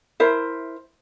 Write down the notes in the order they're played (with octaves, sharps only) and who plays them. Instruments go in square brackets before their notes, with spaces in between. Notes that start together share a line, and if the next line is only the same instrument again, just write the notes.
[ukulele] E4 A#4 C5 E5